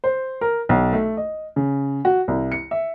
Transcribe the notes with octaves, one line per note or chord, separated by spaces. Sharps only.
C5
A#4
B1
A3
D#5
C#3
F#4
C2
C#7
E5